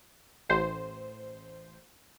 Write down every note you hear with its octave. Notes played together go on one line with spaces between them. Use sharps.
A1 C5